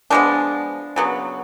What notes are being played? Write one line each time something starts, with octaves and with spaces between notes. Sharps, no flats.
F3 G#3 B3 D4
C#3 F#3 B3